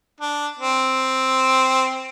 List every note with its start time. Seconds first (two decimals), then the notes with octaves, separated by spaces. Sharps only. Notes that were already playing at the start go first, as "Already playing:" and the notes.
0.20 D4
0.59 C4